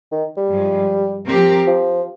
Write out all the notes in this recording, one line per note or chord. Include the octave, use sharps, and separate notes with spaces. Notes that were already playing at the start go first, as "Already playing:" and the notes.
D#3
G3
G2 F3 G#3
F3 C4 G4 A#4
F3